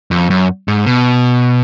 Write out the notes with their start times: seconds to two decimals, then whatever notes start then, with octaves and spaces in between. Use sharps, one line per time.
0.11 F2
0.30 F#2
0.68 G#2
0.86 B2